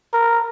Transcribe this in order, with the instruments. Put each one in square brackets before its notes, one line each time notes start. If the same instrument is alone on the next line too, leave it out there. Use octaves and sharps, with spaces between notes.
[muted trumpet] A#4